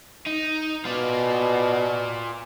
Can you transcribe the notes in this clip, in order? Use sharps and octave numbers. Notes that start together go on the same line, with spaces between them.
D#4
B2 F4 D5